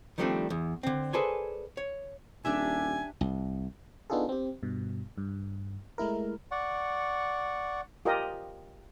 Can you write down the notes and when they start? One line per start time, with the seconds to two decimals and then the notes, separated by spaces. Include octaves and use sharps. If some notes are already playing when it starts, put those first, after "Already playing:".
0.18 D#3 F3 G3 A3 C4 D4
0.50 E2
0.83 D3 C4
1.13 G#4 A4 B4 C5 D5 G#5
1.77 C#5
2.45 D#1 D4 G4 E5 G#5
3.21 C2
4.10 B3 D4 D#4 F4 G#4 A4
4.29 C4 G4
4.63 G2 B2
5.18 G2
5.98 G#3 A3 E4 A#4
6.51 D5 F#5 C#6
8.05 F4 G4 A#4 D#5